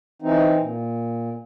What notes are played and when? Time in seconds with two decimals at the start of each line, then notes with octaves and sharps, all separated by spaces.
0.22 E3 C4 D#4
0.57 A#2